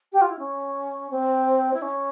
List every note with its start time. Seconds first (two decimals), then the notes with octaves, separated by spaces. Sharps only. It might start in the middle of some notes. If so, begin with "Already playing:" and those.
0.12 G4
0.21 F4
0.30 E4
0.39 C#4
1.10 C4
1.73 E4
1.82 C#4